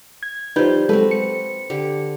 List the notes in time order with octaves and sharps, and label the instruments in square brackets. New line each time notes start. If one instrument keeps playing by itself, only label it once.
[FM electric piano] G#6
[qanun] F3 G3 [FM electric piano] D#4 B4 G6
[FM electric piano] F#3 G#3 A4 [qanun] C4 F#4 B4
[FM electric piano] C#7
[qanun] D3 G4